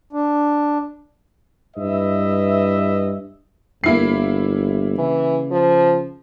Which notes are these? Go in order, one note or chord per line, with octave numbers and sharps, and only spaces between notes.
D4
G2 E4 B4 D#5 E5
G1 A#3 E4 C7
C#3 E3
F3